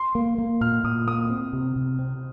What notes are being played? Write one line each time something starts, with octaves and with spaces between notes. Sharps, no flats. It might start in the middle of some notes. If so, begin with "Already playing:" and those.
Already playing: C6
A#3
A#3
A#2 F6
A#2 D#6
A#3 D#6
C4
C3
C3
C4